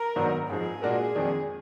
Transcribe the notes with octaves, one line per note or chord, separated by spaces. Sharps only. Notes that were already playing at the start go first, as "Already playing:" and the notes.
Already playing: A#4
G#2 D#3 F#3 B3 D4
G#2 F3 G#3 G#4
A#2 G#3 D4 F#4 A#4
F2 D#3 G#3 D4